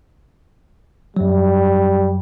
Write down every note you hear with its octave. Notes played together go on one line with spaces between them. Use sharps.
F#2 F#3 G3